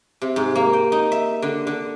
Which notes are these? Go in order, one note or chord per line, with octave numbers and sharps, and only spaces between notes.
C3
G#2
A#3
G5
D#4
E5
D3
D3